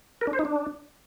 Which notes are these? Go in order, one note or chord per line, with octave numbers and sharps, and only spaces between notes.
A#4
D4
C5
D#4
D4